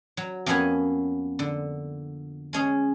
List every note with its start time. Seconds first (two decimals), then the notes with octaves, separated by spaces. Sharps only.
0.17 F#3
0.46 F2 A#3 B3 C#4 F#5 G#5
1.39 D3
2.53 G#3 C#4 G#4